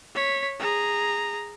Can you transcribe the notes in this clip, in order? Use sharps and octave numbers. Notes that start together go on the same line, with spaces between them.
C#5 B6
G#4 A#5